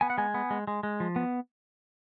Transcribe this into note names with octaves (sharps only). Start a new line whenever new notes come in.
B3 G#5
F#5
G#3 G#5
B3
G#3
G#3
G#3
F3
B3